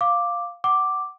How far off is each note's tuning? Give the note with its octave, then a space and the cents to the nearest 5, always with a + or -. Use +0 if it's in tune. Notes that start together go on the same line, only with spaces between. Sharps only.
F5 +0 D6 +0
F#5 +20 D6 +0